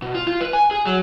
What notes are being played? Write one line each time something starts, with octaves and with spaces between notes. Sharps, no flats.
B2
F4
F4
B4
G#5
G#4
F#3